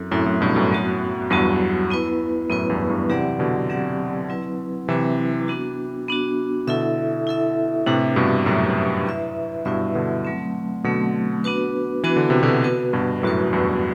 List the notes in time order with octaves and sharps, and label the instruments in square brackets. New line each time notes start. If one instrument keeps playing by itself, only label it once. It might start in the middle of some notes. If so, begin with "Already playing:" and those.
Already playing: [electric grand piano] F#2 [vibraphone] C4 E4 A4
[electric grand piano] F#2 A2 [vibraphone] C4 E4 A4
[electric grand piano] F#2 A2
G2 B2
F#2 A2
[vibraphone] F#3 B3 F#4
[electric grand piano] E2 G2 [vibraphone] F#3 B3 F#4
[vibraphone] B3 E4 B4
[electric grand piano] F#2 A2 [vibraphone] B3 E4 B4
[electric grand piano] E2 G2
E2 G2
[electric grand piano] C3 E3 [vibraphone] F#3 C4 G4 D5 F#5
[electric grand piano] B2 D3
[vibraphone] F#3 C4 G4 D5 F#5
F#3 C4 E4 B4
[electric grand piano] C3 E3 [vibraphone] F#3 C4 E4 B4
[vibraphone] B3 D4 F#4
B3 D4 F#4
[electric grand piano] B2 D3 [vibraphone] E4 A4 E5
[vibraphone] E4 A4 E5
[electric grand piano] A2 C3 [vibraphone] D4 G4 B4 E5
[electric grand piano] G2 B2
[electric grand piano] F#2 A2 [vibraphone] D4 G4 B4 E5
[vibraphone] E4 B4 E5
[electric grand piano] G2 B2 [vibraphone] E4 B4 E5
[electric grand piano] B2 D3
[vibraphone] F#3 A3 C4
[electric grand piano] B2 D3 [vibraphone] F#3 A3 C4
[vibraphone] B3 D4 F#4 B4
[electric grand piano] E3 [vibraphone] B3 D4 F#4 B4
[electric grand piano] D3
C3
B2 D3
[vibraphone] B3 F#4 B4
[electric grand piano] G2 B2
[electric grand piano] F#2 A2 [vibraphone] B3 F#4 B4
[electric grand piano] E2 G2